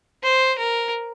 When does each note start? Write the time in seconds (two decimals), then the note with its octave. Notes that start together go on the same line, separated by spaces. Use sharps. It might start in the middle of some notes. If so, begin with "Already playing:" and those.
0.24 C5
0.59 A#4